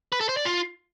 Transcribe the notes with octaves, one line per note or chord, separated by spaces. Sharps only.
B4
A4
C5
D5
F4